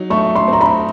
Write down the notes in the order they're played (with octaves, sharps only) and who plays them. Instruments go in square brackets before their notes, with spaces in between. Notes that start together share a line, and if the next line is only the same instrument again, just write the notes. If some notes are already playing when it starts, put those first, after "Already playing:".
Already playing: [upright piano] F#3 D#4
[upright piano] A3 [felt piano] C#6
[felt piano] C6
[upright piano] C4
[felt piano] A#5
B5